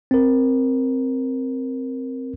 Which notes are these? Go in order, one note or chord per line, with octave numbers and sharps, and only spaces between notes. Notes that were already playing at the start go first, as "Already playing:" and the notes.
C4 A#4